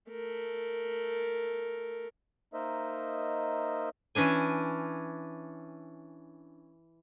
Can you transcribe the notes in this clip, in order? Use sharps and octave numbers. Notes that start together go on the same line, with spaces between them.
A3 A#4
A#3 D#4 A#4 C5 D#5 E5
E3 C#4 D4 G#5